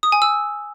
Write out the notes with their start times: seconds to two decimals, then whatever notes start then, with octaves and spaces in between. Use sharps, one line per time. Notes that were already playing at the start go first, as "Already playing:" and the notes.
0.03 D#6
0.12 G#5
0.22 E6